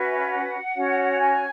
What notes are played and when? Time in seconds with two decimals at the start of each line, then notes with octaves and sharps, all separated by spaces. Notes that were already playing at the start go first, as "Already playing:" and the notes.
Already playing: C#4 F#4 B4 E5
0.30 F#5
0.74 C#4 F#4 C#5
1.18 G#5